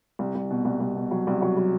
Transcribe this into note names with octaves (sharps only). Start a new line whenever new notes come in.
C2
C2
B2
C2
C2
B2
F#3
C2
F#3
F#3